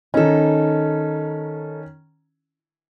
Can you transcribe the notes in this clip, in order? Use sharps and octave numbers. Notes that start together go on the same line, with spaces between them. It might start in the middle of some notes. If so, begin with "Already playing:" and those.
D#3 C#4 D#4 A4